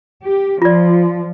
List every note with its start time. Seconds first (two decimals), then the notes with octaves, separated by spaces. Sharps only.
0.23 G4
0.62 F3 F4 D5